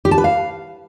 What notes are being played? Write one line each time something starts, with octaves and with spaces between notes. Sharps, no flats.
G4
A5
B4
F5